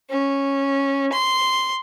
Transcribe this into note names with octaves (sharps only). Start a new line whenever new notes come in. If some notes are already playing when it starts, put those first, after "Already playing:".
C#4
C6